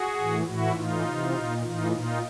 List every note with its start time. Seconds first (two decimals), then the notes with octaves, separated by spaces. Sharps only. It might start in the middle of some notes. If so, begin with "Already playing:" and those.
Already playing: F#4 G#4
0.16 A2 E3
0.45 A2 E3 E4 F#4
0.74 A2 E3 D#4 F4
1.04 C3 E3
1.34 A#2
1.62 A2 E3 D#4 F4
1.92 A#2 D#4 F4